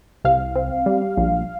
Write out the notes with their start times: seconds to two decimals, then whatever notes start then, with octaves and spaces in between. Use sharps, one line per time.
0.25 C2 F5
0.56 C4
0.86 G3
1.17 A#1